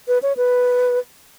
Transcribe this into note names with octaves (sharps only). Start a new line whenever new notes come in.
B4
C#5
B4